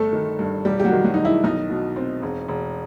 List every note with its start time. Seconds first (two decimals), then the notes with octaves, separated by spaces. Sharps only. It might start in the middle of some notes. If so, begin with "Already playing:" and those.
Already playing: G1 A3 A4
0.13 D#3
0.39 G2
0.65 E1 G3 G4
0.80 G4
0.85 F#3 F#4
0.92 D#3
1.04 F#3 F#4
1.14 D#3 D#4
1.25 E4
1.44 B1 D#4
1.70 B2
1.96 C4
2.22 E1
2.48 E1